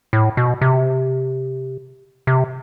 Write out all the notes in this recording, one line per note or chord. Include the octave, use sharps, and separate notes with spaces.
A2
B2
C3
C3